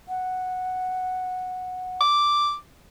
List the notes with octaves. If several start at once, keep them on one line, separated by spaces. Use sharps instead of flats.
F#5
D6